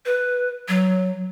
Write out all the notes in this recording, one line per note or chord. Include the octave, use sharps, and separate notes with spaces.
B4
F#3